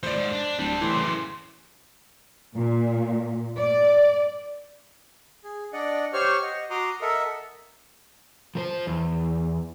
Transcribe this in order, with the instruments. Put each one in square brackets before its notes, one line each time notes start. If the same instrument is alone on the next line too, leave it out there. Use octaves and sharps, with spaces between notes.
[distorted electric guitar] A2 F3 [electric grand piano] C5 D5
[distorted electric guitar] G#2
D4
[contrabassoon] D1 [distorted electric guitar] G3 C4 [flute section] A5
[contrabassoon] A2 [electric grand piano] E3 [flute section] C6 D6
[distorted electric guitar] F#2 C#3
[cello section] A#2
D5
[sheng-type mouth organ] G#4
D4 D5 D#5 F#5
G4 C5 C#5 C#6 F6
D#5 F#5
F#4 A#5 C6 D6 D#6
A4 A#4 D#5 E5 F#5
[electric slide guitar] F3 A#4 C5
E2